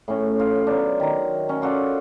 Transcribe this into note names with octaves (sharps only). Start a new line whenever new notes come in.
A2 C#4
F4
F#3 B3 D4
D#3 A#5
C#4
F4 F#4 A4 D5